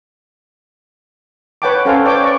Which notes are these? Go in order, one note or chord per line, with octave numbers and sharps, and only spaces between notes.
B4 C#5 F#5 G5 A5 D6
C#4 A4 C5 F5 G#5
B4 C#5 D5 G5 A5 D6
D5 C#6